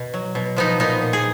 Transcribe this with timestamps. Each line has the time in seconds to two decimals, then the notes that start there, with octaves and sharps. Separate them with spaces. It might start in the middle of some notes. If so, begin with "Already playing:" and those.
Already playing: B2
0.14 F#3
0.35 B2
0.56 F3 B3 D#4
0.80 A#2 B3 D#4
1.02 A#2
1.13 G#4